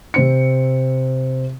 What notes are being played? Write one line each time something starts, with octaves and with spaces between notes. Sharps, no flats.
C3 C4 C#7